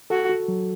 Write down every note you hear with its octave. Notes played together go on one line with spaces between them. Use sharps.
F#4 A4
F#4
F#3